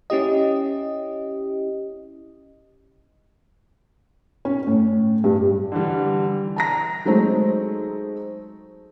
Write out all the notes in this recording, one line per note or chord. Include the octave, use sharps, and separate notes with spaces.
C#4 E4 G4 D#5
C#4
A2
G2
D3 E3 G3
A5 A#5 A#6
F#3 G#3 A3 C4 D#4